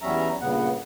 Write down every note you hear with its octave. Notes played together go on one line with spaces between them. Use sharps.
E2 F#3 G3 C#4 E5 A#5
G2 A#2 C#3 B3 F#5